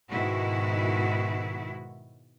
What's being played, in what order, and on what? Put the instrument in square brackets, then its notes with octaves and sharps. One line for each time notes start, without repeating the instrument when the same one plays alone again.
[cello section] G#2 B2 D#3 E4 F#4